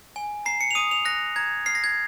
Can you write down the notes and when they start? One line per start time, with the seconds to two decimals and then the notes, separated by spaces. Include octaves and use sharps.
0.16 G#5
0.46 A#5 C7
0.61 C#7
0.71 F7
0.75 D#6 D#7
0.91 F7
1.05 F#6 A#6
1.36 A#5 G#6
1.66 F6 C7
1.75 A#6
1.84 G#6